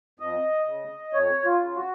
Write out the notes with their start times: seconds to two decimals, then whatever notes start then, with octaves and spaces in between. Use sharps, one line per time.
0.19 F2 D#5
0.67 C#3
1.13 F2 C#5
1.45 F4
1.60 C#3
1.76 F#4